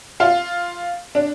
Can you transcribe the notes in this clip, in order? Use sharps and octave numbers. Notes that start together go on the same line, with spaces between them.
F4
D4